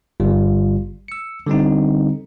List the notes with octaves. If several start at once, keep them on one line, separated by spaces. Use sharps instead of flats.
G1 G3 F4
E6 C#7
D3 G3 C4 D#4